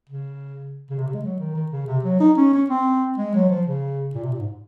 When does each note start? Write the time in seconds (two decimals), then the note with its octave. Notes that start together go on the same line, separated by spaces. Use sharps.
0.10 C#3
0.90 C#3
0.99 C3
1.07 C#3
1.14 G#3
1.23 F#3
1.39 D#3
1.55 D#3
1.72 C#3
1.87 C3
2.04 F#3
2.20 D#4
2.37 C#4
2.53 C#4
2.70 C4
3.18 G#3
3.34 F#3
3.50 F3
3.67 C#3
4.15 A#2
4.23 C3
4.32 A#2
4.40 G#2